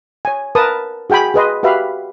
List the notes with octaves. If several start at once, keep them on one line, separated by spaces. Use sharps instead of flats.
C#5 G#5
A#4 B4 A5 D#6
F#4 G#4 G5 G#5 B5
G#4 B4 D#5 C6
F#4 G4 B4 E5 F5 B5